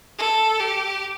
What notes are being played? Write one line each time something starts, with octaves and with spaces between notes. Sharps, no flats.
A4
G4